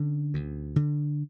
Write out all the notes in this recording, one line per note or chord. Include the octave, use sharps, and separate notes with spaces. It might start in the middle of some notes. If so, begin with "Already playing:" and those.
Already playing: D3 C#4
D2
D3